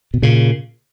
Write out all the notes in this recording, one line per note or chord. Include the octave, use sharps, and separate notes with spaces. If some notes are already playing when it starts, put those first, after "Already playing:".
B2
A#2 C#3